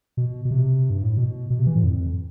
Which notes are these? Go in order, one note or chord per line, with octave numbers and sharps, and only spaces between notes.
B2
B2
C3
G2
A2
B2
B2
C3
E3
A2
F2